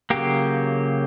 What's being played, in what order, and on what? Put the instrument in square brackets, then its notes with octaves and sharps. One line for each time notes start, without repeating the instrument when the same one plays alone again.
[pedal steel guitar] C#3 F#3 A#3 G4